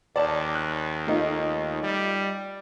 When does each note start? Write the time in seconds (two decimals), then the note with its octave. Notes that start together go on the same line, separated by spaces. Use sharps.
0.16 D#2 D5 A5
0.55 F#6
1.07 A3 D#4 F4
1.83 G3